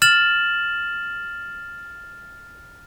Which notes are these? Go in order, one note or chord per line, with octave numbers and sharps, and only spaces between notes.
F6 A6 E7 F#7